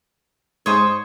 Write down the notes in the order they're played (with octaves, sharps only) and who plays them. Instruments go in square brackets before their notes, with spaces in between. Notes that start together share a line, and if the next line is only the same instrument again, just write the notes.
[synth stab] G#2 D#6 [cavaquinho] C5 C#5